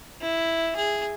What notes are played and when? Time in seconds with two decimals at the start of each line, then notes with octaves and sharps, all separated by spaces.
0.21 E4
0.76 G#4